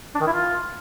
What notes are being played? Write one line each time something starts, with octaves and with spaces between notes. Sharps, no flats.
D4
D#3
E4
F4